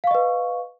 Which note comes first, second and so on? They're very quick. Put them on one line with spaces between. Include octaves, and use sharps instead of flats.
F5 C#6 D#5 B4